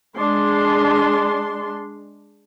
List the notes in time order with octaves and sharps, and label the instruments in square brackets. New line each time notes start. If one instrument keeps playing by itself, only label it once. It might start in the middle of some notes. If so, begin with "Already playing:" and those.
[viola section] G#3 D4 C6